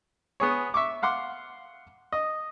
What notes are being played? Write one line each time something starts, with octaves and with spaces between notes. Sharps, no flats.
B3 G#4 C#5
E5 C#6 D6
F5 F#5 C6 D6
D#5